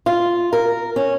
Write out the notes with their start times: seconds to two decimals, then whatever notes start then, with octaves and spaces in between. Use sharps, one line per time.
0.06 F4
0.53 A#4
0.96 C#4